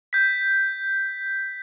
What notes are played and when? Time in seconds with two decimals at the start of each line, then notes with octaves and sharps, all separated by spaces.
0.13 G6 B6